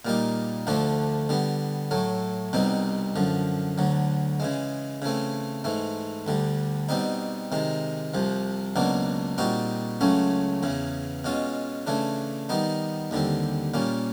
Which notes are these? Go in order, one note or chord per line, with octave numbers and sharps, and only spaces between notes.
A#2 G3 A#3 D#4
D2 D3 F3 A3 D4
D3 G3 B3
A2 F#3 A3
C2 B2 G3 C4 D#4
F#2 D3 F3
D2 D3 F#3
C#3 E3 G#3
C#3 E3 A3 C4
G#2 E3 A3
D2 D3 G3
B2 G3 C4 D#4
C3 D#3 G#3
C2 C3 F3
C#2 B2 F#3 A#3 D4
A#2 G3 C4 D#4 F#4
C#2 C#3 F#3 A3 C#4
E2 C#3 E3
B2 G#3 C#4 F4
C#3 E3 A3 D4
D#3 G3 B3 D#4
D#2 D3 G3 C4
A#2 G3 A#3 C#4